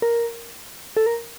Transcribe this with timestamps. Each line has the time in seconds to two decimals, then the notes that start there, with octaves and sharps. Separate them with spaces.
0.02 A#4
0.97 A4
1.06 A#4